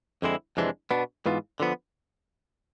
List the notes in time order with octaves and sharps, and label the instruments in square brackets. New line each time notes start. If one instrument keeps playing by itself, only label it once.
[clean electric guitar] F2 D3 G#3 C4 E4
F2 C3 E3 G#3 D4
B2 B3 D4
G#2 E3 B3 F4
D3 F3 B3